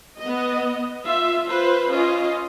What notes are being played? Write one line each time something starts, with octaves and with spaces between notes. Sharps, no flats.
B3 D#5
F4 E5
F4 B4 C5
C#4 F4 D#5